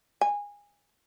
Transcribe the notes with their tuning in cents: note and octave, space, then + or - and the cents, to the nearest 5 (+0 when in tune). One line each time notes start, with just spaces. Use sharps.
G#5 -20